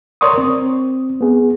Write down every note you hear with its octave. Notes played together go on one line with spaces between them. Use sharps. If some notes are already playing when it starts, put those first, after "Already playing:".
A#4 C#5 D5 C6 C#6 D#6
C4
B3 G#4